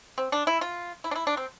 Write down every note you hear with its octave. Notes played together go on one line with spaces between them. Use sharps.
C4
D4
E4
F4
E4
D4
E4
D4
C4